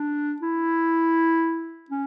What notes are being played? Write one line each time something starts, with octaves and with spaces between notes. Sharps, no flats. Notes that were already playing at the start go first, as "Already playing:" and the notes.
Already playing: D4
E4
C#4